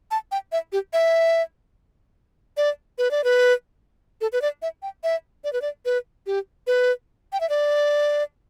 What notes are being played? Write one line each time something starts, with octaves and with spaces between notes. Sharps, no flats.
A5
G5
E5
G4
E5
D5
B4
D5
B4
A4
B4
D5
E5
G5
E5
D5
B4
D5
B4
G4
B4
G5
E5
D5